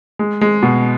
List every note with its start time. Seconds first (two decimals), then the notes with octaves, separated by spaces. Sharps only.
0.19 G#3
0.41 G#3
0.63 B2